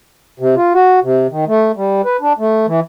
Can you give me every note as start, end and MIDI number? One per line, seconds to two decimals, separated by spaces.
0.40 0.55 48
0.56 0.73 65
0.74 1.00 66
1.03 1.27 48
1.30 1.45 51
1.47 1.72 57
1.76 2.02 55
2.05 2.17 71
2.21 2.33 62
2.38 2.66 57
2.67 2.80 52